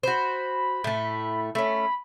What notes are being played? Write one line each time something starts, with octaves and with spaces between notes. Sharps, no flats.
F#4 C5 B5
A2 A3
A3 C#4 B5